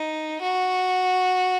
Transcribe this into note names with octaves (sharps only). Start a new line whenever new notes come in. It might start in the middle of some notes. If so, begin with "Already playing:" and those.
Already playing: D#4
F#4